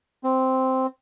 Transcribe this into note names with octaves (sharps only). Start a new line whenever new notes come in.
C4